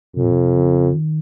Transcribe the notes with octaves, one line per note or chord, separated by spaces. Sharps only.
F2 C3
A#2
C3
C#3
D#3